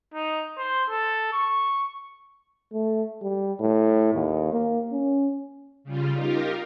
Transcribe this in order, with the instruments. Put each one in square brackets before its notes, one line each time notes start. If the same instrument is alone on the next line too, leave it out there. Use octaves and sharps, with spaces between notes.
[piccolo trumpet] D#4
C5
A4
C#6
[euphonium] A3
G3
A2
D#2
A#3
C#4
[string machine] C#3 G3 F4
D#4 F4 G4 A#4